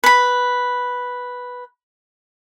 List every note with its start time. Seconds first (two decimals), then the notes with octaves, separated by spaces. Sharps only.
0.04 B4 B5